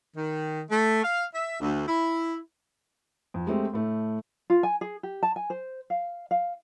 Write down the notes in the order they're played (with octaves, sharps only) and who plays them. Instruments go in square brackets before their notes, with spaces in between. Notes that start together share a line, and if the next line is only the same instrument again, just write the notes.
[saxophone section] D#3
A3
F5
E5
D2
E4
[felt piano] F2
G#3 A3 C4 G4
A2 A3
[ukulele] F4
G#5
G#4
G4
A5
G#5
C5
F5
F5